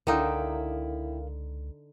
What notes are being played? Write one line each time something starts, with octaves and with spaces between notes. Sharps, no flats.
C#2 D3 D#4 E4 A#4 F5 G5